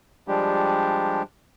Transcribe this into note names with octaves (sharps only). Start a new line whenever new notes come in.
F3 G3 G#3 D4 G4